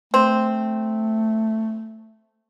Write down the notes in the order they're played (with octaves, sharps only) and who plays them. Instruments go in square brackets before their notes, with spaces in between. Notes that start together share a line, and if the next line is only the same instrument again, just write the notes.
[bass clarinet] A3 [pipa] C4